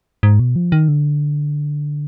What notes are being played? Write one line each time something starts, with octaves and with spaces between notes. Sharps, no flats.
G#2
B2
F3
D#3
D3